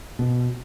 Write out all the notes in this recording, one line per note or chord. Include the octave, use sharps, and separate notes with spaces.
B2